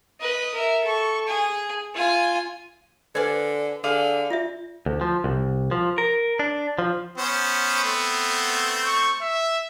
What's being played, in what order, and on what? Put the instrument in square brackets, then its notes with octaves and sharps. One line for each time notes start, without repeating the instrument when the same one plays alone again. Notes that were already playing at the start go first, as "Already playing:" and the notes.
[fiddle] B4 D#5
A#4 E5
A4 C#6
G#4 G#5
F4 G#5
[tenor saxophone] D3 [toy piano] B4 C5 [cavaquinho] D5 G#5
[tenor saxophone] D3 [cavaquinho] G#4 F5 D6
[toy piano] F4 D5 E5
[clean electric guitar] D2
F3
C2
F3
A#4
D4
F3
[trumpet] B3 [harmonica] C#4 C5
[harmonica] A3 C4
[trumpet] C#6
E5